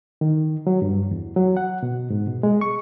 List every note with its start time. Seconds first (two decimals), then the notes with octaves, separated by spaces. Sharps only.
0.21 D#3
0.67 F#3
0.82 G2
1.11 E2
1.36 F#3
1.57 F#5
1.83 B2
2.10 G#2
2.27 B2
2.43 G#3
2.61 C#6